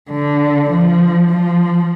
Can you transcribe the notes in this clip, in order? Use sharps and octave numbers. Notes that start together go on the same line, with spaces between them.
D3
F3
F3